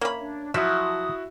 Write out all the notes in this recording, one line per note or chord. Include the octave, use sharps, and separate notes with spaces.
A#3 C#4 C#5 E5 A#5 B5
D4 C#5
F3 F#3 E4 F#4 E5 D#6